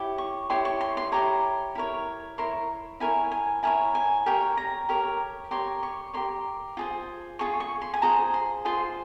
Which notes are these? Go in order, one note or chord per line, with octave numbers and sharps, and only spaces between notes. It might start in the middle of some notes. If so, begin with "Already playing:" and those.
Already playing: E4 G4 C#5
C#6
E4 G4 C#5 C6
C#6
C6
C6
E4 G4 C#5 A#5
E4 A#4 C#5
E4 A#4 C#5 C6
E4 A#4 C#5 G#5
G#5
E4 A#4 C#5 G#5
G#5
G4 A#4 C#5 G5
A#5
G4 A#4 C#5
G4 A#4 C#5 C6
C#6
G4 A#4 C#5 C6
F4 G#4 C5
F4 G#4 C#6
C#6
C6
G#5
F4 G#4 C5 A#5
C6
F4 G#4 C5 C6